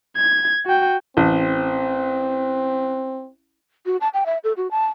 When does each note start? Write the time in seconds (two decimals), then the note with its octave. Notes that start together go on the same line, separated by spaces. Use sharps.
0.17 G#6
0.66 F#4 G5
1.17 A1 C4
3.86 F#4
4.01 A5
4.14 G5
4.26 E5
4.44 A4
4.57 F#4
4.71 A5